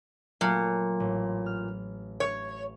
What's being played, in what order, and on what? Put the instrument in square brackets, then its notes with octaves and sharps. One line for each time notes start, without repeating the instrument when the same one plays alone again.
[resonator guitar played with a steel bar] A#2 [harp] F#3 A3 A#3
[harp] A1
F6
[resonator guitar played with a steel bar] C#5